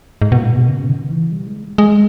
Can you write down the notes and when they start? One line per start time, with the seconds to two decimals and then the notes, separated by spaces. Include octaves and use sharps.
0.22 G#2
0.32 B2
0.37 A#2
0.53 B2
0.69 C#3
0.89 D#3
1.10 E3
1.32 G3
1.47 G#3
1.78 G#3